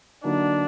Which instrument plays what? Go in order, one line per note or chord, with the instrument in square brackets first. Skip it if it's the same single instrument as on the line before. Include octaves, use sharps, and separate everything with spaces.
[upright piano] D3 F#3 A#3 D#4 [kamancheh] D4